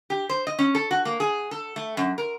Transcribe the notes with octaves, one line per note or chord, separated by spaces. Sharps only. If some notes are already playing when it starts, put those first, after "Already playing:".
G4
C5
D#5
C#4
A4
F#4
A#3
G#4
A4
A3
F#2
A#4